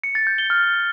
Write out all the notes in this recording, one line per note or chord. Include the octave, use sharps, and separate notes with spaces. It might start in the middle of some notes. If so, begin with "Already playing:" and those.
C#7
A6
G6
G7
F6